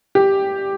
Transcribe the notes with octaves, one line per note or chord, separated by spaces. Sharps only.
G4